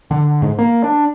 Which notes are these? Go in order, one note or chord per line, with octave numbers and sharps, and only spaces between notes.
D3
G#2
A#3
D4